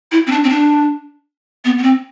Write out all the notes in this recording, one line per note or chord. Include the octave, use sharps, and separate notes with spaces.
E4
C4
D4
C4
D4
B3
B3
C4